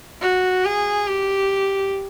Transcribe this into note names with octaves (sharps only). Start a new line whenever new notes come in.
F#4
G#4
G4